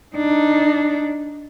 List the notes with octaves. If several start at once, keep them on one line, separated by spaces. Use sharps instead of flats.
D4 D#4